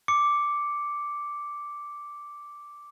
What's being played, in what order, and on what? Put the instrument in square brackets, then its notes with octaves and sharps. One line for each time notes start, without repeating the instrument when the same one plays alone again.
[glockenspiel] D6 C#7